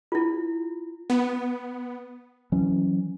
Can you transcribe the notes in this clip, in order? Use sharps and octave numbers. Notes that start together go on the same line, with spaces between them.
E4 F4
B3
E3 F#3 C#4